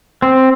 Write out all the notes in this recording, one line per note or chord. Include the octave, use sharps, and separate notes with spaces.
C4